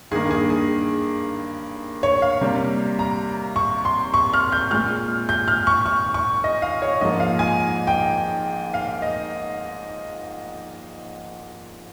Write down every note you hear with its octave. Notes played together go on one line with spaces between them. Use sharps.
G2 D#3 A#3 G#4
G#4
G#4
C#5
F5
C3 G3 A#3
A#5
C#6
C6
C#6
F6
G6
A#2 G#3 F6
G6
F6
C#6
C#6
C#6
D#5
F5
C#5
G#2 F3 A#3 D#5
F5
G#5
G5
F5
D#5